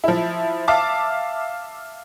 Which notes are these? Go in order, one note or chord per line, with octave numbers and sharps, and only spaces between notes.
F3 E4
E5 F5 A5 D6